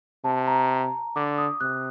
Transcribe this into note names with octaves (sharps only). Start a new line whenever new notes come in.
C3 A5
A#5
D3 D6
D#6
C3 F#6